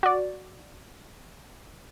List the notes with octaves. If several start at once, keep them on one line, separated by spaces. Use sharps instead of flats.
F#4 D5